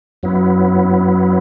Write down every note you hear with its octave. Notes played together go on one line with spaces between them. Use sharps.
F#2 F#3 B3 E4